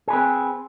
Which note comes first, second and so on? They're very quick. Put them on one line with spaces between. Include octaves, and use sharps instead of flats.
G#4 B4 C4